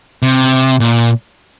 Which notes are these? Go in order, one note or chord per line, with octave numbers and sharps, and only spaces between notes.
C3
A#2